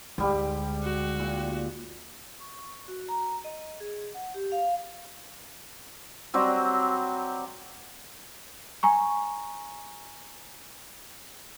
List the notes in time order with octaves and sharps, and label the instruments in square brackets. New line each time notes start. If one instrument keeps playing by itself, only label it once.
[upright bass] D2 [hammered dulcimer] G#2 G3 G4
[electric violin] F#4
[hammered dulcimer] A#2
[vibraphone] C#6
F#4
A#5
D#5
G#4
F#5
G4
F5
[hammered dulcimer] F#3 G3 C4
[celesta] G#5 A#5 C#6